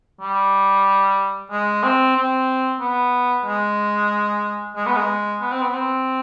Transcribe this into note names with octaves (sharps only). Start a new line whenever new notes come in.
G3
G#3
C4
C4
B3
G#3
G#3
B3
G#3
B3
C4
B3
C4